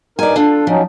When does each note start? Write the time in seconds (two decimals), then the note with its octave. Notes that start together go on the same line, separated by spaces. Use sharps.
0.19 G2 D#4 A#4 D5 G#5
0.36 D4 F4 A4
0.67 F3 F#3 C#4 D#4